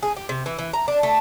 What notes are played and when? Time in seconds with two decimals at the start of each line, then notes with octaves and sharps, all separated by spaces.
0.03 G#4
0.17 G4
0.29 C3
0.46 E3
0.59 E3
0.73 A#5
0.88 D4
1.03 A3